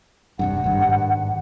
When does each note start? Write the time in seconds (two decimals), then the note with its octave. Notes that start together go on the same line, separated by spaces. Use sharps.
0.39 E1 C2 G2 F#5
0.64 G#1 G2